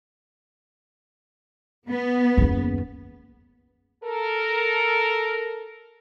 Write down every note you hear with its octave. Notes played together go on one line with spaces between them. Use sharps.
B3
F#1 D#2
A4 A#4